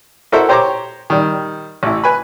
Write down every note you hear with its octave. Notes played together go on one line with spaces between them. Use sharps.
E4 F#4 A4 A#4 C5 E5
G4 C5 C#5 A#5 C#6 D6
D#3 G3
A1 E4
B4 G#5 B5